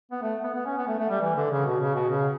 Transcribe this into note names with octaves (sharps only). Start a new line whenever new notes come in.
B3
A3
B3
B3
C#4
B3
A3
A3
G3
E3
D3
C#3
B2
C#3
B2
C#3